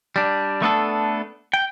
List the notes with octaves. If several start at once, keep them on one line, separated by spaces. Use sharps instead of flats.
G3 D4
A3 B3 D4 A4
G5